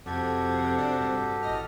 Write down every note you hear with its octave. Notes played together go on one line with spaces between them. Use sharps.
F2 C3 F#4 G4 A4 G#6
D4
G2
A1 D#5 F6